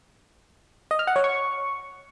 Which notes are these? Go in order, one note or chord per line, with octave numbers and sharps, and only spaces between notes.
D#5
F6
F#5
C#5
C#6